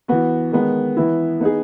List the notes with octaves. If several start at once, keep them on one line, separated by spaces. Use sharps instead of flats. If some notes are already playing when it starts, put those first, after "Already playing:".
E3 B3 F#4
D#3 G#3 B3
E3 B3 E4
B3 D#4 G#4